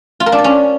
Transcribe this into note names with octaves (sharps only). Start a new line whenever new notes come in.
F4
A#4
D4
D5
C#4